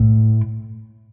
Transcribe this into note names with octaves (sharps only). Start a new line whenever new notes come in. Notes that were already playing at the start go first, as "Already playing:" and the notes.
Already playing: A2